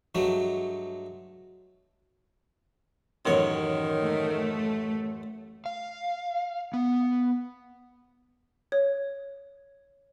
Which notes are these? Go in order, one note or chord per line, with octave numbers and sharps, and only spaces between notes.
G2 F#3 G#3 A3
A1 F#2 D#3 C#5
A3
F5
B3
C#5